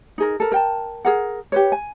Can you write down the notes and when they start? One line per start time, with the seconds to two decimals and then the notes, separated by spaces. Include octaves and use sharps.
0.18 D#4 G#4 A#4
0.40 A4 A#4
0.52 A#4 G5 A5
1.05 G#4 A#4 F#5
1.52 G4 B4 C#5
1.72 G#5